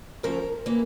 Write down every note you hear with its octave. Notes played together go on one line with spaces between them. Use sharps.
D2 C#3 F3 A3 C#4 A#4
E3 A#3 E4